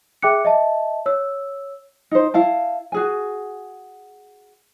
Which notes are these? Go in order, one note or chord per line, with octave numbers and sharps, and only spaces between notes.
G#4 E5 G5 D6 F#6 C#7
D#5 E5 A5
C#5 E6
D#4 C5
E4 F5 A5
F#4 G#4 G#5